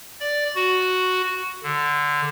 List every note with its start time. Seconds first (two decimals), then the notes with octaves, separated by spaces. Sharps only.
0.20 D5
0.55 F#4
1.64 D3